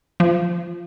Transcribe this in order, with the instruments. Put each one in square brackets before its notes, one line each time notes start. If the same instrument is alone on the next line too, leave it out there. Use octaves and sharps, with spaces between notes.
[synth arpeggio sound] F3